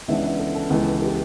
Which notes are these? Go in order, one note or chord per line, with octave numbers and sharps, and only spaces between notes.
C#2 C#3 E3 B3 D4 E5
E5
A4
A4
C#2 C#3 E3 B3
G4